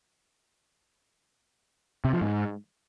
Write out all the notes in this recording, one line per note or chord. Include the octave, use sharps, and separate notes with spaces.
C3
F3
G#2